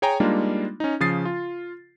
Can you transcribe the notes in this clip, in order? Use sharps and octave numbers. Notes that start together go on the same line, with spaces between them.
G#4 C#5 G5 G#5 A#5
G3 G#3 A#3 D4 D#4 F4
C#4 D#4
C#3 F3 D#6 A6 C7
F4